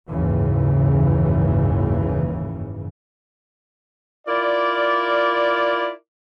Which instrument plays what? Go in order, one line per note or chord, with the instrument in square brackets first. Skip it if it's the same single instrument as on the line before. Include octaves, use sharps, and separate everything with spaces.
[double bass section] F#1 D#2 G#2 C#3 E3
[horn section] E4 F4 A#4 D5